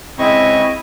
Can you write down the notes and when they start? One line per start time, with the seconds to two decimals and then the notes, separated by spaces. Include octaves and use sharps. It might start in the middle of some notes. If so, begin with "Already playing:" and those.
0.19 C#3 G#3 C4 E4 D#5 C#6